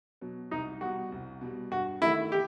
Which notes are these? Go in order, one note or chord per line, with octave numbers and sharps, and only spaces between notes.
B2 F#3
C2 D#4
B2 G3 F#4
C2
B2 G3
G2 F#4
D#3 A3 E4
G4